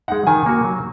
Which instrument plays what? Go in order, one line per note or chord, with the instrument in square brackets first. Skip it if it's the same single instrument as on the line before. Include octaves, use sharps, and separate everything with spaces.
[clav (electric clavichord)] G#3 D#4 [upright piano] F#5
[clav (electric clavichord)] D#3 [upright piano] G#5
[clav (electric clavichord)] A#3 F#4
F#3